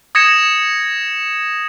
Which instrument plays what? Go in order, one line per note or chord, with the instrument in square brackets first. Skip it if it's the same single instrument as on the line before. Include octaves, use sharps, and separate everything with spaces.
[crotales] D#6 G#6 A#6 C#7 E7